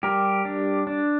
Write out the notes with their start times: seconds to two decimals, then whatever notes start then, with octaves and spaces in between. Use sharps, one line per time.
0.03 G3 G4 A#4
0.45 D4
0.87 D4